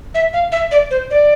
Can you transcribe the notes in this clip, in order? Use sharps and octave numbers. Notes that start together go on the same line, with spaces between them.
E5
F5
E5
D5
C5
D5